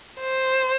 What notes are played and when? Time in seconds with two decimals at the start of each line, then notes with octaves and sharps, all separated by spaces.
0.20 C5